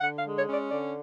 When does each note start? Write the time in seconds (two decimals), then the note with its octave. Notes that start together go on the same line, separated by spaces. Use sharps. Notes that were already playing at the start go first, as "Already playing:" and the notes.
0.01 D3 F#5
0.18 F5
0.25 G#3
0.36 C#5
0.48 C#4
0.53 D5
0.71 D3 D5